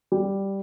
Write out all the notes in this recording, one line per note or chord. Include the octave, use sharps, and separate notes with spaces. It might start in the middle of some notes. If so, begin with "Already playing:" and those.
G3